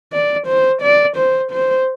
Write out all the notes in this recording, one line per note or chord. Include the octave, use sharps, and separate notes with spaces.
D5
C5
D5
C5
C5